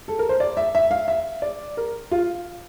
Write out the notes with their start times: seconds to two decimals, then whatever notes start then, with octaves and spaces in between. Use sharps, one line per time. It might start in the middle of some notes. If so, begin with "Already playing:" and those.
0.08 A4
0.19 A#4
0.29 C5
0.40 D5
0.57 E5
0.75 E5
0.91 F5
1.08 E5
1.42 D5
1.77 A#4
2.11 F4